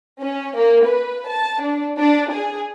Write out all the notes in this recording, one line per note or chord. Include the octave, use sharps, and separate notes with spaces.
C#4
A#3
B4
A5
D4
D4
G#4